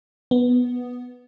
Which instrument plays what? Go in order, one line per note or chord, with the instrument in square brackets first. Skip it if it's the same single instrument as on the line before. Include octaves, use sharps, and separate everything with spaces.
[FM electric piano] B3